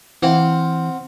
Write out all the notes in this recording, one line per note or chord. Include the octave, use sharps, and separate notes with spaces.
E3 C4 F5 F#5